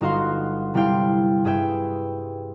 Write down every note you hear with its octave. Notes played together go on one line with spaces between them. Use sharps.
G1 D#4 F#4 F5 F#5 C6
C3 G3 E4 F5 G5 C6
G2 G#4 B4 E5 G5